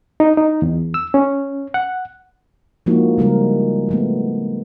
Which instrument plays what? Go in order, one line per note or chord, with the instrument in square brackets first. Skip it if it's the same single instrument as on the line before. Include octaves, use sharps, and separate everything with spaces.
[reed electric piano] D#4
D#4
E2
E6
C#4
F#5
[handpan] F3 G#3 A#3 D#4 E4 F#4
C#3 G3 G#3 A#4
F3 A3 B3